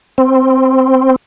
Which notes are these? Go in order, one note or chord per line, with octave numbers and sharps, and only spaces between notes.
C4